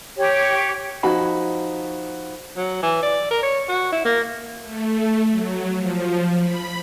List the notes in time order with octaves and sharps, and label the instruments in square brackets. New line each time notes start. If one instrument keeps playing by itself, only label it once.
[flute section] G4 C#5
[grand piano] F3 D#4 F#4 B5
[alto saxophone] F#3
E3
D5
A#4
C#5
F#4
E4
A#3
[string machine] A3
F#3
F3
B5